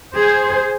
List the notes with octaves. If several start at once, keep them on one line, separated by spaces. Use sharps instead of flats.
G#4 C5